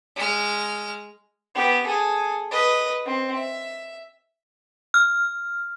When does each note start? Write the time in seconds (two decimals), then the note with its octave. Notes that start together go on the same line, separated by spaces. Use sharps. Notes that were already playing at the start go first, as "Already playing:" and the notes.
0.16 G#3 F6
1.55 B3 G4
1.86 G#4 A4
2.51 B4 D#5
3.05 C4
3.35 E5
4.94 F6